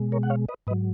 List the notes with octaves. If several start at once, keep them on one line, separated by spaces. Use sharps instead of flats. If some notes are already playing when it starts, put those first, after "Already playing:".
Already playing: B2 G#3
A#4 C#5
F#5
C#5 F5
B4 D#5
G#2 F#3 B4 D#5